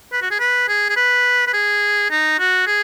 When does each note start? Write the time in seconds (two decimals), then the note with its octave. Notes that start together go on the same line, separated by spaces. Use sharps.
0.12 B4
0.22 F#4
0.31 G#4
0.39 B4
0.68 G#4
0.89 G#4
0.96 B4
1.47 B4
1.53 G#4
2.10 D#4
2.39 F#4
2.67 G#4